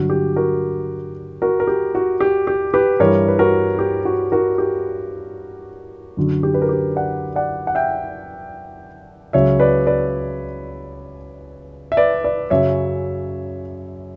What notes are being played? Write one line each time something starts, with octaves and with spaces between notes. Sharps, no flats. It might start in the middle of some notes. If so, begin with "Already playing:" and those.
Already playing: G2 D3 F#3 F#4
G4
F#4 A#4
F#4 A#4
A#4
G4
F#4
G4
G4
G4 B4
G2 E3 G3 A#4 C#5
B4
F#4 A#4
G4
F#4
F#4 A#4
G4
F#2 D3 F#3
G4
B4
A#4
G4
D5 F#5
D5 F#5
F#5
E5 G5
C#2 C#3 F#3 C#5 E5
B4 D5
B4 D5
E5
B4 D5
B4 D5
F#2 C#3 F#3 C#5 E5